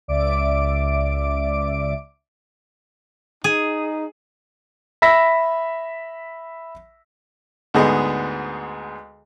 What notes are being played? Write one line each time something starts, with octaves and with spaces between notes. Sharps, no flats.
C#2 D5 E5 D6 D7
D#4 G#4
E5 B5 E6 A#6 B6
D2 G#2 B3 G#4 D#5